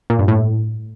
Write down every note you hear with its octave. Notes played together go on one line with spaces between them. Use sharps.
A#2
G2
A2